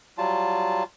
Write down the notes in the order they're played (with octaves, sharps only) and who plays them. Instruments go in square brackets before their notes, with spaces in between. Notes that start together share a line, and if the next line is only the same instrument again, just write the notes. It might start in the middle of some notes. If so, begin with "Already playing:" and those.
[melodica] F#3 G3 F4 A5